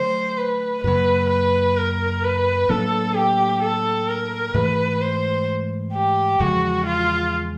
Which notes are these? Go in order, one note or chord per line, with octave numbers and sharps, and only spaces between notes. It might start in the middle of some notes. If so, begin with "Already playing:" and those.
Already playing: D3 F#3 A3 C5
B4
F#2 C#3 F#3 A#3 B4
B4
A#4
B4
A2 F#3 A#3 D4 A4
G4
A4
A#4
G#2 E3 A3 B4
C5
G4
E2 C#3 F3 G#3 F#4
F4